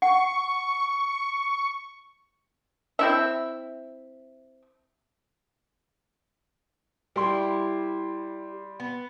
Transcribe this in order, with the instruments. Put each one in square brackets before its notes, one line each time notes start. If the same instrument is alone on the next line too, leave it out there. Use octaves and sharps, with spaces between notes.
[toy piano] F#5 [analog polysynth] C#6
[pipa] C4 E4 E5
[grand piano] G3 C6 [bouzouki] E4 G4
[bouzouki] B3